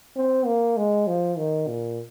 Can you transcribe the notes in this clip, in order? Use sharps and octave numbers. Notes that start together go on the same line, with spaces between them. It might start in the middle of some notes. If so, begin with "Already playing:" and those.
C4
A#3
G#3
F3
D#3
A#2